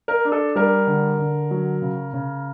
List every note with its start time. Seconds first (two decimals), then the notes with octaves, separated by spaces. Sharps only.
0.08 A#4
0.25 D4
0.32 A4
0.55 G3 A#4
0.87 D3
1.19 D3
1.51 F#3
1.82 C#3
2.13 C#3